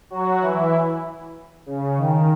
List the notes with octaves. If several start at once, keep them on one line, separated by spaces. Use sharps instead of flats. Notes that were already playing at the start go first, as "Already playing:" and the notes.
F#3 F#4
E3 E4
C#3
D#3